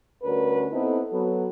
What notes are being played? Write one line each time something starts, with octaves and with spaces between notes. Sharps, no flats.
D2 G3 C#4 F#4 A#4 B4
B3 C4 D#4 E4 A4
F#3 B3 A4